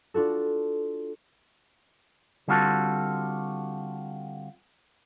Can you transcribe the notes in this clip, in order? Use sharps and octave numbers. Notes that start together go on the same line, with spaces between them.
D4 F4 F#4 A4
D3 G3 C4 F4 F#4 A4